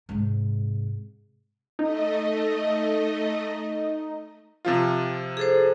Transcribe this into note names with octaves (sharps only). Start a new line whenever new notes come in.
G#2 C3
A3 D#4 D#5
C3 F3 F4
G#4 A4 C5